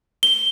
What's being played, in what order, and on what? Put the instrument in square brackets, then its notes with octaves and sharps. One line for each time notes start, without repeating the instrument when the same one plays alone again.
[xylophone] G7